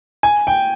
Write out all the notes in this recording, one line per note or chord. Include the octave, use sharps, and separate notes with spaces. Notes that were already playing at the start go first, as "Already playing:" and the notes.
G#5
G5